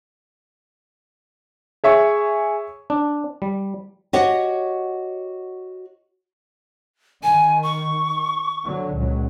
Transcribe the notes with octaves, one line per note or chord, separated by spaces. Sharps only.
G#4 C#5 E5 C#6
D4
G3
F#4 G4 C#5 D#5 F#5
D#3 G#5
C#6
D3 F#3
C#2 A#2 F#3